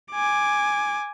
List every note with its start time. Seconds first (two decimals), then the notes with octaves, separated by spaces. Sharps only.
0.13 G#5 D6